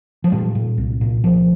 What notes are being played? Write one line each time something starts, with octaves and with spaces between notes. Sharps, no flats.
F3
A#2 G3
A#2
C2
A#2
C2 F3